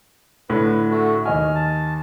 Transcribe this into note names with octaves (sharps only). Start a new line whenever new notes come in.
A2 D3 B4
A3 F#4
D#2 D#5 G#5 F6
A5